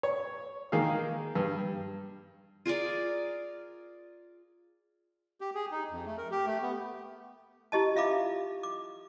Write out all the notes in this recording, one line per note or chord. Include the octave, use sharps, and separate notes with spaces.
C#5
D#3 A#3 G#4 F5
G2
F4 G#4 A#4 D5
G4
G#4
D#4
F2
A3
A#4
G4
A3
B3
E4 G4 D#5 A5
F4 E5 F5 B5 D6
D6